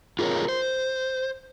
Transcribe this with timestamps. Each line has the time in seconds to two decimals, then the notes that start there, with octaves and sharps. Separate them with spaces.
0.19 F4 G#4 A#4 C5 C#5
0.49 C5